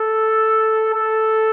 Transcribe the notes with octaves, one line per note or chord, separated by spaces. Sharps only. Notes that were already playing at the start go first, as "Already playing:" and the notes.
Already playing: A4
A4